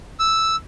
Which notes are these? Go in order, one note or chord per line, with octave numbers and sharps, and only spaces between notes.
E6